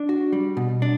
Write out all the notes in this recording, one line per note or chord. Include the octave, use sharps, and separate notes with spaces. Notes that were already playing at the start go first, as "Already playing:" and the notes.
Already playing: D4
F#4
G3
B2
D4